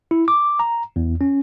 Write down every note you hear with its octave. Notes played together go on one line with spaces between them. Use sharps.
E4
D6
A#5
E2
C#4